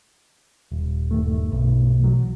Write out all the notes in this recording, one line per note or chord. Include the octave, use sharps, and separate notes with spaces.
D#1
G2 D#3 A3
B1
B2 E3 F#3